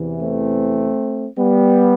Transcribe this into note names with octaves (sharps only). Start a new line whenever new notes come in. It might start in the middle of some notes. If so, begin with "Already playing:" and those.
Already playing: E2 C3 E3
A3 C4
G3 B3